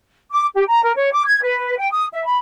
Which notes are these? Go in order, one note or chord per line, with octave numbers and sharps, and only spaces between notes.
D6
G4
A#5
A#4
C#5
D6
G#6
B4
G5
D#6
E5
B5